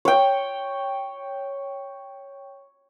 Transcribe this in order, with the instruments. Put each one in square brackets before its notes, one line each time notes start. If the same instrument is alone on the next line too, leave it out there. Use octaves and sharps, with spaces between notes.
[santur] C#5 G5